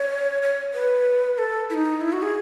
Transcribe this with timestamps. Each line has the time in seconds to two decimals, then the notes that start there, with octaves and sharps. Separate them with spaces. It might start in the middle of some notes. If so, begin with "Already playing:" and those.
Already playing: C#5
0.42 C#5
0.74 B4
1.38 A4
1.70 E4
1.74 D#4
2.01 E4
2.13 F#4
2.22 G#4